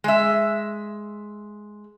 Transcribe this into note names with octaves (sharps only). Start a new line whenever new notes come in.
G#3 E5